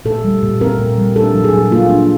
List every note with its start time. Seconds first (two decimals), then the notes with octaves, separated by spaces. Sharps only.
0.05 A#2 A4
0.24 G3
0.43 A#2
0.61 C4 A#4
0.79 A#2
0.98 G3
1.16 D4 A4
1.34 F#3
1.44 G#4
1.53 A#2
1.71 A#3 F4
1.89 D4